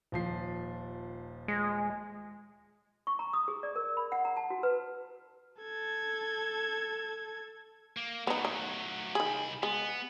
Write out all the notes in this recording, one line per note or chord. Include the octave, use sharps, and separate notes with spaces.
D#1 F3 C7
G#3
C#6
A#5
D#6
G#4
D5
A#4
B5
F#5
A#5
A5
F#4
B4
A4 G#6
A#3
F#3 A3 B3 D#4
D#4
C2 D#3 G#4 B5
G#3 B3